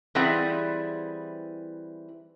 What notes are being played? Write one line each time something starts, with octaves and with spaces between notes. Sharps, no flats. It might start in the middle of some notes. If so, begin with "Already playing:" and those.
E3 G3 C4 E4 G#4 F#5